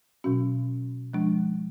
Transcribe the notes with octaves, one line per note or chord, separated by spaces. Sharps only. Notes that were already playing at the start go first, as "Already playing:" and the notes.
B2 F#3 C#4 F#4
F3 G#3 D4